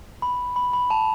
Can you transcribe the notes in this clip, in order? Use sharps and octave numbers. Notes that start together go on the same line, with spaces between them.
B5
B5
B5
A5